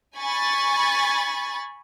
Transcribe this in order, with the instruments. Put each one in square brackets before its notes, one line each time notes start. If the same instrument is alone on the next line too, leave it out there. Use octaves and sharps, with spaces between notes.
[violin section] G#5 B5 C#6 A6